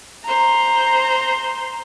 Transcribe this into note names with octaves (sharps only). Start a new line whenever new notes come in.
C5 A#5